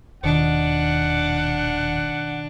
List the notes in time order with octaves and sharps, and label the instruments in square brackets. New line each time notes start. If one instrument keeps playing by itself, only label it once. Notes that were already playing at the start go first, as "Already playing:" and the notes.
[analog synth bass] D#1 [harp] B2 D#3 C#7 [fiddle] D4 [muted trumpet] F#5